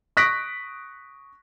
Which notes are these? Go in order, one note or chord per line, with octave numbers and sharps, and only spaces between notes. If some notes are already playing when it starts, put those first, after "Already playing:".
C#6 D#6 F#6 A#6 B6 D7